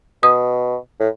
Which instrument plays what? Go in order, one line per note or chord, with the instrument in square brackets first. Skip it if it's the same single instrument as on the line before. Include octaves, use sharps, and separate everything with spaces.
[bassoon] B2 [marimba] D#6
[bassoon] A2